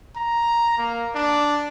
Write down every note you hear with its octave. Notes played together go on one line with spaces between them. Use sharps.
A#5
A#3
D4